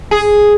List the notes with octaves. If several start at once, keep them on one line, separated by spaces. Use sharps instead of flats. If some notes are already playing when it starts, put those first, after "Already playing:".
G#4